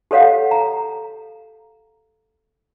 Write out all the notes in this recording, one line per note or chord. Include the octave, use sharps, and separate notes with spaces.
G4 A4 C#5 F5 F#5
A#5